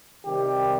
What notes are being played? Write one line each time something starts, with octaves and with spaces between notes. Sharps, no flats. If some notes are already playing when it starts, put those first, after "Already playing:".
C3 D#3 G3 G4